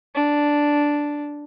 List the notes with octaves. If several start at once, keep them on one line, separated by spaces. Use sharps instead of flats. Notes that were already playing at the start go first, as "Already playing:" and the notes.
D4